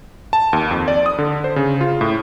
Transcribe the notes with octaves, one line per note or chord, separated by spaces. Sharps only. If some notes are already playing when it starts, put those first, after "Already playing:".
A5
D#2
F2
D5
D#6
D3
C5
C#3
F4
A2